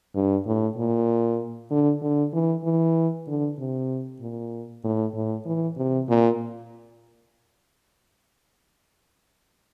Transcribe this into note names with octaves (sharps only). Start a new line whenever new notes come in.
G2
A2
A#2
D3
D3
E3
E3
D3
C3
A#2
A2
A2
E3
C3
A#2